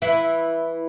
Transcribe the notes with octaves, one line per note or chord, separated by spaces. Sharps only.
E3 E4